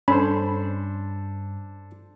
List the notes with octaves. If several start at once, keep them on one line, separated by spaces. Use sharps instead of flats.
G2 C#4 D4 A4 C5 B5